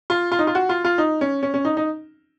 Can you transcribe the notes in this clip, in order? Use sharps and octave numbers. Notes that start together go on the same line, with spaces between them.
F4
F4
D#4
F4
F#4
F4
F4
D#4
C#4
C#4
C#4
D#4
D#4